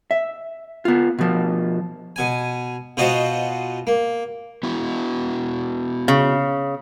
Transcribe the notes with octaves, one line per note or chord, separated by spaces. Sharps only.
E5
B3 F4
B2 F3
B2 G#5
B2 F4 F#4 C5 D#5
A#3
B3 E4 F#4
C#3